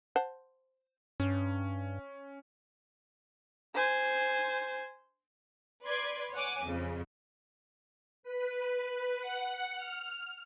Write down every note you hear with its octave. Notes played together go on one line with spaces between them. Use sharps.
C5 F#5 A5
G2 C#4
C5 G#5
B4 D5 C6 G#6
C#5 F#5 G#5 D6
F2 C#3
B4
F#5
F6